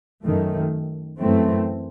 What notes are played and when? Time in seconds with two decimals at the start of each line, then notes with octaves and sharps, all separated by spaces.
0.23 F#2 D#3 A3
1.18 F#2 E3 A3 C4